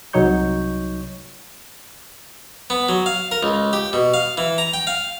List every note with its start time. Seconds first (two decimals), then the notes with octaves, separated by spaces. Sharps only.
0.13 C2 F#3 D#4 C#5 C#6 G6
2.70 B3
2.89 F#3
3.06 F5
3.31 A#4
3.43 C#2
3.73 G4
3.93 B2
4.14 F5
4.37 E3
4.58 A#5
4.73 G5
4.87 F5